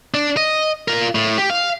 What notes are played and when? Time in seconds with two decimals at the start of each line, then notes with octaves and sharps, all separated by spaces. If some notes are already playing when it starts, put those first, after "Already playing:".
0.14 D4
0.37 D#5
0.88 F4 A#4
1.15 A2
1.38 G4
1.50 F5